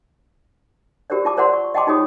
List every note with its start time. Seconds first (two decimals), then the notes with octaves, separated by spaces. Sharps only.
1.10 F#4 G4 A#4 C5 D5
1.25 F4 A5 D6
1.37 A#4 C5 D5 F#5 C6
1.53 C#6
1.74 D#5 F#5 G5 A5 C6 D6
1.87 D#4 F4 F#4 G#4 C#5 D#6